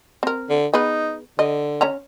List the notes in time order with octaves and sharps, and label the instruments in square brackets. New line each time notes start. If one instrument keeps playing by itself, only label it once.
[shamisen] C4 A#4
[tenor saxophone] D3
[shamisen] B3 G#4 B4 [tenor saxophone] D#4
[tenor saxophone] D3 [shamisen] D#5
[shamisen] C#4 C#5 A#5